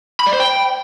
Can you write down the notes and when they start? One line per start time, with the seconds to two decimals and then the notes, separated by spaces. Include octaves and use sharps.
0.20 B5
0.27 D5
0.33 C5
0.40 G5